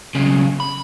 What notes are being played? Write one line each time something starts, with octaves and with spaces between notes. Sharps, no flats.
B1 C#3
B5